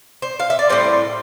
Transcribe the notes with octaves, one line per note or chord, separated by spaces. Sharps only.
C5
F5
E5
D5
A2 G3 C4 C5